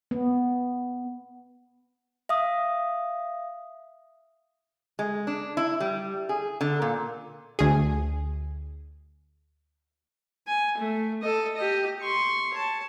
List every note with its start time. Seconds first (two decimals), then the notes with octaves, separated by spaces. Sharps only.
0.11 B3
2.29 E5 F5 D#6
4.99 G#3
5.27 D4
5.57 E4
5.80 G3
6.29 G#4
6.61 D3
6.82 A#2
7.59 D2 G#4
10.47 G#5
10.77 A3
11.22 A4 D#5
11.56 G4 D#5
12.01 C6 C#6
12.53 C#5 A5